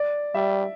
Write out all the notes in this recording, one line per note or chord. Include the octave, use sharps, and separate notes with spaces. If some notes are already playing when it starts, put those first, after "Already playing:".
Already playing: D5
G3 E5